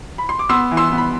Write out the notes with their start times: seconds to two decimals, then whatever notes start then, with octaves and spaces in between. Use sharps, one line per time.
0.18 B5
0.29 C6
0.39 D6
0.49 B3 C6 E6
0.71 E3
0.77 C6 E6
0.92 B3
0.98 B5